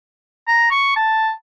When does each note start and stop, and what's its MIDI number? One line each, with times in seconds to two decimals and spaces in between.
0.48 0.68 82
0.71 0.95 85
0.96 1.30 81